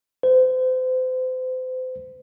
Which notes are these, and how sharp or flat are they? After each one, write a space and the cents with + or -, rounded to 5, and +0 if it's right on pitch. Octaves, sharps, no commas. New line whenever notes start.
C5 -35